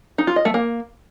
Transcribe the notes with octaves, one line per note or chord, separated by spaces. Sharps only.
D#4
F4
D#5
A3
A#3